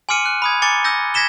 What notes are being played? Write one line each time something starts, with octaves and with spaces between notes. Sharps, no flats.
G#5 C6 D6 F6 C#7 D#7
F#6
B5 D#6 G#6
G#5 A#5 D6 A6 C#7 G7
E6 G6 A#6
G#6 A#6 B6 E7 G7